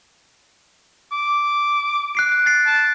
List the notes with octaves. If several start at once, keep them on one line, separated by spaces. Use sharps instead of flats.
D6
F#6 C7 D7
A6 C7
A5